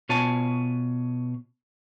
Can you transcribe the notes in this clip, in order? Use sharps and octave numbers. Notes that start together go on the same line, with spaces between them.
B2 F4 C#5 G#5 A5